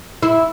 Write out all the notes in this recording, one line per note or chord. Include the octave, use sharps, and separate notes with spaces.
E4